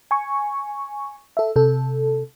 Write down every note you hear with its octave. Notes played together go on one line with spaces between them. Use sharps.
G#5 C#6
A4 E5
C3 A4